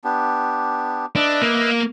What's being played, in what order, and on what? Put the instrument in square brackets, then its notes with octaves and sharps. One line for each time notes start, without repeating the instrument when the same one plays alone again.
[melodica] B3 D4 G4
[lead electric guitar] D4 [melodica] B4 D#5 E5
[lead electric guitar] A#3